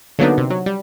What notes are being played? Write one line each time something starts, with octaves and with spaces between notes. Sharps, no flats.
D3 F#3 A#3 B3 D4 D#4
C3
F#3
G3